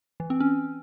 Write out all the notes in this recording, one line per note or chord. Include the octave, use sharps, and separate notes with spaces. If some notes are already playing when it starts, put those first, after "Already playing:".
E3
C4
C#4